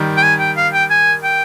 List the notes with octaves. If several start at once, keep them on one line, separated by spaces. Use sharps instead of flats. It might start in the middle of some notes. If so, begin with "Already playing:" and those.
Already playing: D#3 G3
G5
G#5
G5
F5
G5
G#5
G5